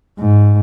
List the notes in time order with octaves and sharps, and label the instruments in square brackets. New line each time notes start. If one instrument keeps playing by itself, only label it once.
[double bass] G#2